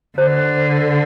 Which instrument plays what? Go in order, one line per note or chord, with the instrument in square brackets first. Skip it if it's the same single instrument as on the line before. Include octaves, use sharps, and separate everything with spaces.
[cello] D3 [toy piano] C5